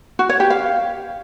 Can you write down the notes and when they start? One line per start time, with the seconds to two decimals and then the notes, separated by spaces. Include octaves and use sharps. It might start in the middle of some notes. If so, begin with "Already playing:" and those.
0.19 F#4
0.29 C#5
0.40 G4
0.50 F5